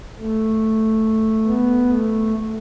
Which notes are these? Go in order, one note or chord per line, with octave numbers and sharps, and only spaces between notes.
A3
B3
A3